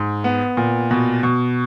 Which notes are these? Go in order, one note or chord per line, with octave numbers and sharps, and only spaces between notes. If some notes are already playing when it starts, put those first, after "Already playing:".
Already playing: G#2
B3
A#2
B2
B2